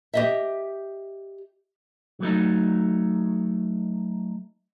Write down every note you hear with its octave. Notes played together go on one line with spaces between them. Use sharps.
G4 D#5 E5
F#3 A3 D#4